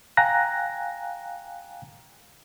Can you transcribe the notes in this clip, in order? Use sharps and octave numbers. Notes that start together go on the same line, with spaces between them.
F5 G5 G#5 A#5 F#6 A#6